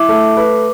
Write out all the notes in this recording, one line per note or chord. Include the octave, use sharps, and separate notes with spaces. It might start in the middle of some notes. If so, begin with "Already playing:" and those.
Already playing: E4 D6
A3
B4